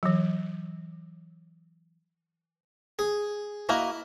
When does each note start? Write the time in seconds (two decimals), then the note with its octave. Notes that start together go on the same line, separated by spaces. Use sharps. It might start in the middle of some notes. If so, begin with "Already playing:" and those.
0.03 E3 F#3
2.99 G#4
3.69 A#3 E4 F#4 D#5